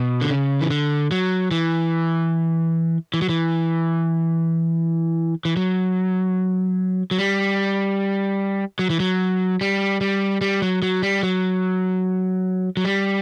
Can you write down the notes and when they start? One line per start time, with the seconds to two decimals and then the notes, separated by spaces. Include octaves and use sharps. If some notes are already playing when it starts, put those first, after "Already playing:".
Already playing: B2
0.21 D3
0.30 C#3
0.61 E3
0.71 D3
1.11 F#3
1.51 E3
3.14 E3
3.22 F#3
3.29 E3
5.45 E3
5.57 F#3
7.11 F#3
7.18 G3
8.79 F#3
8.90 E3
9.00 F#3
9.61 G3
10.01 G3
10.41 G3
10.62 F#3
10.82 F#3
11.02 G3
11.23 F#3
12.77 F#3
12.85 G3